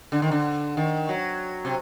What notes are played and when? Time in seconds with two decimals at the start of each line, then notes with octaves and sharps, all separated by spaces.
0.12 D3
0.22 D#3
0.32 D3
0.77 D#3
1.09 F#3
1.65 C3